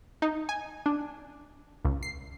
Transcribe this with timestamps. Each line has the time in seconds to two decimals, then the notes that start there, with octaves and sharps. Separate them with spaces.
0.22 D#4
0.49 G#5
0.86 D4
1.85 C#2
2.03 C7